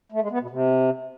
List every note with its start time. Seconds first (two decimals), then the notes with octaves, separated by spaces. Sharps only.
0.12 A3
0.21 G#3
0.31 B3
0.40 B2
0.50 C3